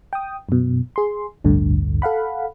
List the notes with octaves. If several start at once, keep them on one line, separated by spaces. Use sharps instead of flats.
G5 D#6
F#2 B2
G#4 C6
A1 D2 G2 D3
A4 F5 F#5 B5